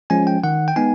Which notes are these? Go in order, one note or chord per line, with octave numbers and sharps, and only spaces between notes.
F3 G#3 C#4 G#5
G5
D#3 F#5
G5
G#3 B3 D#4 G#5